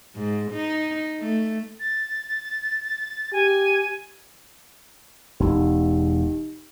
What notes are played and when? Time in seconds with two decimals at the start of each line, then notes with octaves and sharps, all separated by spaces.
0.16 G#2
0.52 D#4
1.20 A3
1.80 A6
3.33 G4 G#5
5.40 E1 D#4 G4